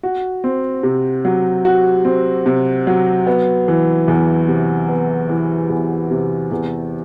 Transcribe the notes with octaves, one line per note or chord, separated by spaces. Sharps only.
F#4
C4
C3
F#3
F#4
C4
C3
F#3
B3
E3
E2
C3
B3
E3
E2
C3
E2